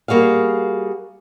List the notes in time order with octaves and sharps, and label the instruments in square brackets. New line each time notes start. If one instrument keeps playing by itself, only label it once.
[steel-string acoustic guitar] G3 A#3 F#4 G#4 F5